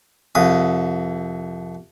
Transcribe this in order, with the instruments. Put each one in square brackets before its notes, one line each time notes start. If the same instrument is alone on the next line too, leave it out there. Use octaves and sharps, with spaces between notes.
[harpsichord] C2 F2 D#6